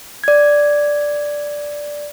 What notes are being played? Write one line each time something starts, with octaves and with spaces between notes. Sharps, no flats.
D5 G#6